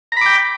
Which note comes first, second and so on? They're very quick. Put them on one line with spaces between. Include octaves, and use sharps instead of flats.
A#5 B5 D6 G5